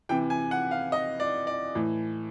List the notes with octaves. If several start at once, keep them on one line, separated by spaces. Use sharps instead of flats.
C3 E3 G5
G#5
F#5
F5
D#5
D5
D5
A2 E3